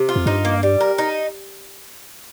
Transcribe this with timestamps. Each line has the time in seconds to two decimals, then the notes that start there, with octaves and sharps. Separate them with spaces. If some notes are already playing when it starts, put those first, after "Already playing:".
Already playing: C3
0.09 F4
0.16 F2
0.26 G2 D#4
0.45 A#3
0.63 G3
0.81 A#4
0.98 D#4